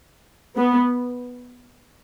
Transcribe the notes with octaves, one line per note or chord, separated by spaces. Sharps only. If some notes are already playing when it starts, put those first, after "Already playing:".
B3